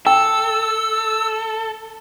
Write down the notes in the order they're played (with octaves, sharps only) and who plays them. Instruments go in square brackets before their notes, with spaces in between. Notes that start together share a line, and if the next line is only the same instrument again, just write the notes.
[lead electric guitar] A4 [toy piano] G5 [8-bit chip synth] E6